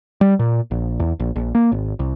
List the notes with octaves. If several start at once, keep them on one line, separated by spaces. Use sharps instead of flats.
G3
A#2
A#1
E2
A#1
A#1
A#3
G#1
C2